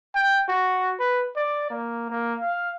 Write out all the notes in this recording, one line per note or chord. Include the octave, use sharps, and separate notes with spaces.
G5
F#4
B4
D5
A#3
A#3
F5